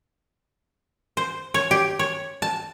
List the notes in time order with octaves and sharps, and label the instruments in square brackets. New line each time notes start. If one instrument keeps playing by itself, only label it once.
[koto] C5
C#5
G4
C#5
A5